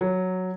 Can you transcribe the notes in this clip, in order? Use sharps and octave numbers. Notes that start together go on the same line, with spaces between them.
F#3